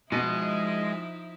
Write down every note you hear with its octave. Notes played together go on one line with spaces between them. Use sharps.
B2 F3 G#3 D#4 E4 D#5